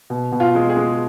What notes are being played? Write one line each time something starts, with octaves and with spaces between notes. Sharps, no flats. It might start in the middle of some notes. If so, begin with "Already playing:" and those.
B2
B2
F4
G#3
G#4
G#3